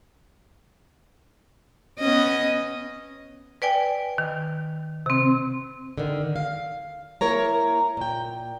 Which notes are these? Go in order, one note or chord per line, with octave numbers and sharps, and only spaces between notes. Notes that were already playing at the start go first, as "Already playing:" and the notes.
B3 C#4 D#5
B4 D5 G5 G#5
D#3
C3 C4
D3 D#3
F5
A#3 E4 A#4 C#5 A#5
A#2 G5